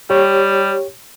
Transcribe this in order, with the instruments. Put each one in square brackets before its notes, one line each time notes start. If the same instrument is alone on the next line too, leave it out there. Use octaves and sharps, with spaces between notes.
[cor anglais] G3 [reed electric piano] G4 C#5